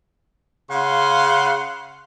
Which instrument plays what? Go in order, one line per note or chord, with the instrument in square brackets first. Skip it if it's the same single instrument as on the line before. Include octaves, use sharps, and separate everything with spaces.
[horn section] C#3 F5 F#5 C6